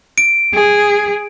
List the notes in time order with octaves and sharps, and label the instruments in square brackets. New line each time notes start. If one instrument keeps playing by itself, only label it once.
[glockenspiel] D7
[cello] G#4